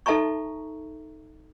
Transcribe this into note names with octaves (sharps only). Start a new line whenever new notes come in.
D#4 A4 E5 A5 A#5 C#6